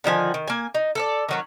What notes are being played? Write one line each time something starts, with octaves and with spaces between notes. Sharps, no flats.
D3 D#3 F3 G#5
D#3
A#3 G#5
D#4
A4 A#4 D5
D#3 F#3 C#4